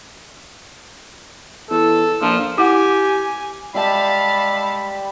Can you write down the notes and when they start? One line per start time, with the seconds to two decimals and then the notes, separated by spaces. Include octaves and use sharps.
1.71 E2 A4
2.21 A#1 F3
2.58 E4 G4 F#5 G#5
3.74 G3 G#3 G4 D5 E5 F5 A5 B5